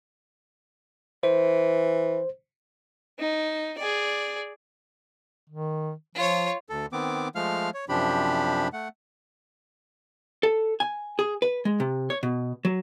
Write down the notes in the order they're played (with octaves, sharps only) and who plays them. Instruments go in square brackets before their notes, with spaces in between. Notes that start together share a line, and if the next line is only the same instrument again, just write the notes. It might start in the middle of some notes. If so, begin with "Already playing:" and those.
[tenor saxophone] E3 [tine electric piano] C5
[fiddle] D#4
G#4 D5
[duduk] D#3
[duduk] F3 [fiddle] F4 C#5
[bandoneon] D2 A4
D#3 B3 C4 D6
F3 G#3 A3 F5 F6
C#5
F#2 C3 F3 D4 G4 B5
A3 F#5
[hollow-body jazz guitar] A4
G#5
G#4
B4
G#3
C3
C#5
B2
F#3